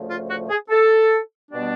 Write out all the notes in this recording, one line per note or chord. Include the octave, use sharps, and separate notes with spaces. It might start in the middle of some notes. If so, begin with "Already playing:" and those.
Already playing: D2 C#3 F3 A3
F4
F#4
G#4
A4
B2 G3 B3 D4